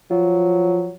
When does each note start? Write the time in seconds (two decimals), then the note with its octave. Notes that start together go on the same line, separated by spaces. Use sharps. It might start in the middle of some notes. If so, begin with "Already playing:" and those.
0.11 F3 F#3 F4